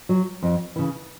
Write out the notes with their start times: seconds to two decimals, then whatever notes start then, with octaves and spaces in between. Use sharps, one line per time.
0.09 F#3
0.42 F2
0.76 C#3 E3